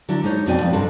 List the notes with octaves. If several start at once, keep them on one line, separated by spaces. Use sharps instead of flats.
D3 F#3 D4 E4
G#3 D#4 C5 C#5
F2 B2 C4 D5 G5 G#5
F3
G2 C3 D4 G4 A4 C5